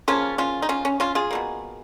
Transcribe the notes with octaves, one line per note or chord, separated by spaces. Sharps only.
C#3 F3 A#3 C#4 F4
C#4 F4
D#4
C#4 F4
C#4
C#4 F4
F4 G#4
B2 F#3 A#3